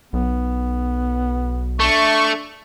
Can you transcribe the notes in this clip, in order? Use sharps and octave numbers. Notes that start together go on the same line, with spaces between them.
B1 B3
A3 D4 C#6